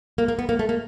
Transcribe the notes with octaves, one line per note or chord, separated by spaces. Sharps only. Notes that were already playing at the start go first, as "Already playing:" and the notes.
A#3
A#3
B3
A#3
A3
A#3